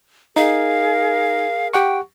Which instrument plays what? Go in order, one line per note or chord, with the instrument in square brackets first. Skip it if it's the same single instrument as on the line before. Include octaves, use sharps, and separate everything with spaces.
[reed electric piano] D#4 [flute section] G#4 A#4 [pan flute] F5
[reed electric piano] G4 F#5 C#6 [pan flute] G5